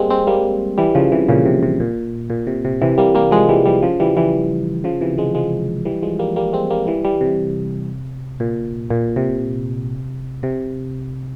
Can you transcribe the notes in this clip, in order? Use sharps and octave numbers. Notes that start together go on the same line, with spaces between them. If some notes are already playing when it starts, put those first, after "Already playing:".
Already playing: G3 G#3 A#3 C4
G#3 C4
G3 A#3
E3 G3
C#3 F3
C3 E3
A#2 C#3
C3
C3
A#2
A#2
C3
C3
C3 E3
G3 A#3
G3 A#3
F3 G#3
E3 G3
E3 G3
C#3 F3
E3 G3
E3 G3
C#3 F3
C3 E3
F3 G#3
F3 G#3
E3 G3
F3 G#3
G3 A#3
G3 A#3
G#3 C4
G3 A#3
E3 G3
E3 G3
C3
A#2
A#2
C3
C3